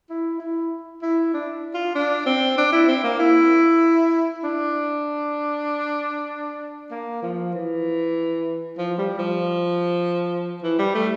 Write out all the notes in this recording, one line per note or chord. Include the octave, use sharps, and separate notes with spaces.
E4
E4
E4
D4
F4
D4
C4
D4
E4
C4
A#3
E4
D4
A#3
F3
E3
F3
G3
F3
E3
G3
A3